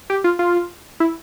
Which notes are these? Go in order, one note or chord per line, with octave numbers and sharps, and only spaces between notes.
G4
F4
F4
E4